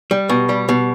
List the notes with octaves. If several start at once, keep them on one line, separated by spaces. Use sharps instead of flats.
G3
B2
G3
B2